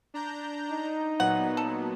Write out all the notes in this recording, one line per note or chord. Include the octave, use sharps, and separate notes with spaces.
D4 A#5 G6
D#4
A#2 F#3 B3 F#5
A4